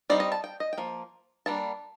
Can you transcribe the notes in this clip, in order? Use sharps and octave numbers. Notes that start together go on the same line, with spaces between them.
G3 C4 D#4 D5
D#5
A5
G5
D#5
G5
F3 A#3
G3 A#3 D4 A5